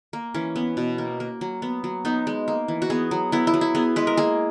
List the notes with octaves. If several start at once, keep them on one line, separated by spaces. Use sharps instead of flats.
A#3
E3 C#4
B3
B2
A#3
A#3
F#3
B3
F#3
B3 D#4
G#3
A#3
E3
F#4
B3 G#4
F#3
B3 E4
E4
F#3
E4
B3 G#4
G#3 B4
A#4
A#3 G#4